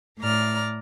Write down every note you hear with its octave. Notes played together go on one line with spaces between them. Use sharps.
A2 D5 A#5 F6